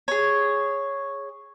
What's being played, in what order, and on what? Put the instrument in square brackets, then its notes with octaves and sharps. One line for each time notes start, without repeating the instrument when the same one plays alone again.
[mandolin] G#4 C#5